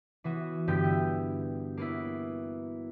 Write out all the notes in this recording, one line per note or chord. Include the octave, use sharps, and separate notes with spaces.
E3 B3 F#4
G2 D3 B3 G4 G6
E4
A#3 B3 E4